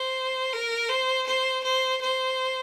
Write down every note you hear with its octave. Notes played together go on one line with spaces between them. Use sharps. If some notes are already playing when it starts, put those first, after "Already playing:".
Already playing: C5
A#4
C5
C5
C5
C5